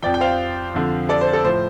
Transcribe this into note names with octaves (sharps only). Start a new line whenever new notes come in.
F2 F3 D5 G5
G5
C5 F5
F2 D3 F3
A4 D5
C5
A4
A2 F3 C5